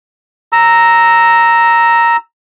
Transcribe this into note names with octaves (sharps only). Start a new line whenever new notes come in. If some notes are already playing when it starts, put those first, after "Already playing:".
A#5 E6